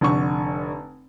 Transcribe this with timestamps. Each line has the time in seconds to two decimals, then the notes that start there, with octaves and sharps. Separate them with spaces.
0.01 F1 D3 C#6